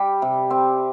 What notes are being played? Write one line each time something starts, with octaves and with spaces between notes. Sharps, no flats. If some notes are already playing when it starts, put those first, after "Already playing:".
Already playing: G3 G4
C3
C4